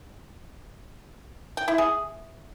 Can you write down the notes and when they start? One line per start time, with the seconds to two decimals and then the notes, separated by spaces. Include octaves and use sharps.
1.57 G5
1.68 E4
1.78 G#4